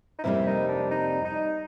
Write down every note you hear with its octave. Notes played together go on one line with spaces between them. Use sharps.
D#4
F2 C3 E3 G3 A#3 E4
D#4
D4
D#4
D#4